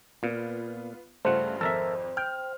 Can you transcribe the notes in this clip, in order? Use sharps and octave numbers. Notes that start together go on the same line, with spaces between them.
A#2 B3 F4
G2 C#3 A3 F4 C5 F#5
G#1 F2 A4 A#4 E5
G5 F6